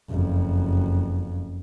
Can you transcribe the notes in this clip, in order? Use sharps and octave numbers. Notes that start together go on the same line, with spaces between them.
F#1 F2